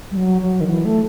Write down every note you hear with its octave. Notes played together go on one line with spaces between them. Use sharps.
G3
F#3
F#3
D#3
E3
A3